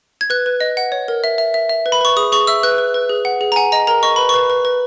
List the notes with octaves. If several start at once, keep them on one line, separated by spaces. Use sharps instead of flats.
G#6
B4 F#6
B4
D#5
F#5
C#5
A#4
E5
E5
E5
E5
B4
B5
B4 C#6
G#4 D#6
G#4 C#6
E5 E6
B4 F#6
B4
B4
G#4
F#5
G#4
A#5
F#5 G#5
D#5 A#5
A#4 A#5
D#5 C#6
B4 B5
B4 C#6
B4
B4